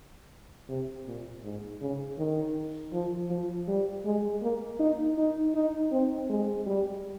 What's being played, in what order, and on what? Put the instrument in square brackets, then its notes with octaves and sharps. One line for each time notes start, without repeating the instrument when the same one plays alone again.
[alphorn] C3
A#2
G#2
C#3
D#3
F3
F3
G3
G#3
A#3
D#4
D#4
D#4
C4
G#3
G3